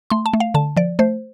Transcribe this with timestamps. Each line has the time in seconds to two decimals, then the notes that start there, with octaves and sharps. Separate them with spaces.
0.10 A3 C6
0.26 A5
0.34 A3
0.40 F5
0.54 D3 A5
0.77 F3 D5
0.99 A3 C5